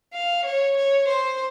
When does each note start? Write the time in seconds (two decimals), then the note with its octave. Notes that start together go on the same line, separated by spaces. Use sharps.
0.13 F5
0.45 C#5
0.77 C#5
1.08 C5